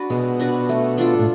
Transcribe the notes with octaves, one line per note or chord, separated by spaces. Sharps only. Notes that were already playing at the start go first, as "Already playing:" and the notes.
Already playing: D4 F#4 B4
B2 G#3
D4 F#4 B4
A3
D4 F4 A4
A2